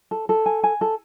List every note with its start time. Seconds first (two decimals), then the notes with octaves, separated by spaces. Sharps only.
0.11 A4
0.29 A4
0.46 G#5
0.64 G#5
0.81 A4